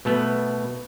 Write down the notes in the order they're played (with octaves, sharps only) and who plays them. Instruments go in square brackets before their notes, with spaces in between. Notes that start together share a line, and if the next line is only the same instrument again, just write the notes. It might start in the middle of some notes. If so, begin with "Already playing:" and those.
[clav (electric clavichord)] B2 A3 B3